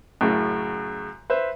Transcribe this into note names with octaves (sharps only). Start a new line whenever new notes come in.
F#2 A2 C#3
B4 C5 E5